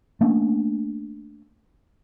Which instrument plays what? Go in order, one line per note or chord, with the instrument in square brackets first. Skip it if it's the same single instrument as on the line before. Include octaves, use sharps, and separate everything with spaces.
[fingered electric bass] A3 A#3 C#4 D4